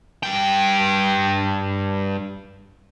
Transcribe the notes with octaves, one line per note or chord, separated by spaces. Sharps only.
G2 G5